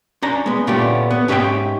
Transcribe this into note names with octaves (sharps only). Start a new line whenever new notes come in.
C#4 D4 A#5
G#3 B3
A#2 D3 A3 B3 C#4 G4
B3
G#2 C#4 G4 D#5 E5 G5